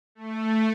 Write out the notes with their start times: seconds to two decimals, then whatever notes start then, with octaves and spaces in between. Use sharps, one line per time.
0.15 A3